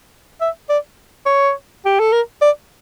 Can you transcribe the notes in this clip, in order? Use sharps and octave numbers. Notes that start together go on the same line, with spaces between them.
E5
D5
C#5
G4
A4
A#4
D5